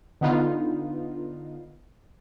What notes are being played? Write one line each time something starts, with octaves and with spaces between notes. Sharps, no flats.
D3 B3 D#4 F4